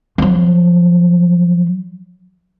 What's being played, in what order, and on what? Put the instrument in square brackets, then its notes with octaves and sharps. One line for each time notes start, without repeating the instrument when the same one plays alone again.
[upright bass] F3 F#3